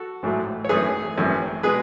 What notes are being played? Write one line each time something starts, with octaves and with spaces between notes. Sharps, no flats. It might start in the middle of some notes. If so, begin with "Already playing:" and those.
Already playing: F#4 A4
A1 G#2 F#3 A3
C#5
G#1 F#2 E3 A3 G#4 B4
G#1 F#2 E3 A3
B2 G#3 G#4 B4